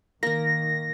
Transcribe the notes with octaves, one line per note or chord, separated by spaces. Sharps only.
D#3 A#3 A#4 A#6